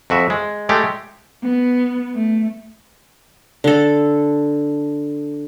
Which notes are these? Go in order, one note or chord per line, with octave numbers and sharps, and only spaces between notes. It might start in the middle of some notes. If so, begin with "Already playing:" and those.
F2 F#4 E5
G#3
G#3 A3 G4
B3
A3
D3 A4